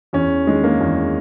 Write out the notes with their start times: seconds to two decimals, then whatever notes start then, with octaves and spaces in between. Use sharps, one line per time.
0.13 E2 C#4
0.47 D#3 G#3
0.64 A#3
0.80 E2